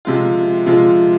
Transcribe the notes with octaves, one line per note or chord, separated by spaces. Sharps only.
C3 F3 G#3 F4
C3 F3 G#3 F4